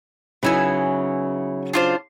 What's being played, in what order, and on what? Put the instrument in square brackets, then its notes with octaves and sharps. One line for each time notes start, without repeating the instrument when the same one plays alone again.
[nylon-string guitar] C#3 F#3 D#4 [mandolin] B3 E4 G#5
[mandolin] D4 F4 C5